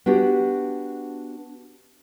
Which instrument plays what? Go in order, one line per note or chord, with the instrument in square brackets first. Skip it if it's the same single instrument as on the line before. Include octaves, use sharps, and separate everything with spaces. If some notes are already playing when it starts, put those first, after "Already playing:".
[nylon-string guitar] B3 D4 F#4 G4